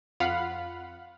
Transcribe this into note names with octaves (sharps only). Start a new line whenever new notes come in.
F2 F4 F5 F#5 B5